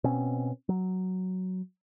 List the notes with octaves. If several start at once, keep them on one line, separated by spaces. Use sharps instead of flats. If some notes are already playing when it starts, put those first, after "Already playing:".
B2 C4 C#4
F#3